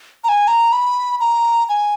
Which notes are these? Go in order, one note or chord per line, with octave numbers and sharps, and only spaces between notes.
A#5
G#5
A#5
B5
A#5
G#5